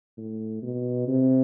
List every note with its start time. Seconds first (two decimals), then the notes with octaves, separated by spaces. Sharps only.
0.17 A2
0.62 B2
1.08 C3